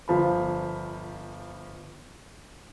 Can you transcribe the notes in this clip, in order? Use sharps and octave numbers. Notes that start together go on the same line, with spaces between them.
G1 F3 B5